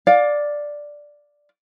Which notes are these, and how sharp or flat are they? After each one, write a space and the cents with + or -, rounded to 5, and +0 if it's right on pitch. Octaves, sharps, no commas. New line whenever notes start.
D5 +0 F5 +25